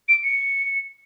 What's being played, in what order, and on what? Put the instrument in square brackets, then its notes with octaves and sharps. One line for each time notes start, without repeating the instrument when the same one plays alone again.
[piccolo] D7
C#7